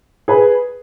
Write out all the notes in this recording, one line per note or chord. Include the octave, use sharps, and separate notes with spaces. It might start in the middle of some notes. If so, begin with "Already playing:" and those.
G#4 B4